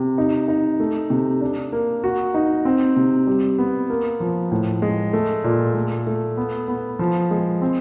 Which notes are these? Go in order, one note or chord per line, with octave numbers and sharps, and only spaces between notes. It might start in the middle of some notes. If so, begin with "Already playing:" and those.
Already playing: C3
D#4
D#4
A3
C3
D4
A#3
F#4
D#4
C4
C3
G3
B3
A#3
F3
A2
G#3
A3
A#2
A3
A3
B3
B3
F3
G#3
C4